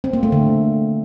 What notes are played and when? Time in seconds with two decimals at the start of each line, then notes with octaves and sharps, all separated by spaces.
0.04 C4
0.13 A#3
0.23 A3
0.32 D3